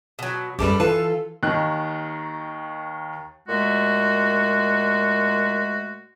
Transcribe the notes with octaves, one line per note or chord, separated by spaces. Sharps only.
B2 F#3
A#1 F#2 G3 G4 A4 B4
E3 F4 A4 B4 A5
D#2 D#3 F#6
A#2 G#3 A3 F#4